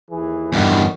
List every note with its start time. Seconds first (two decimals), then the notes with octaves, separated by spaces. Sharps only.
0.11 D#2 E3 G#4
0.52 A1 E2 G2 D#3 F#4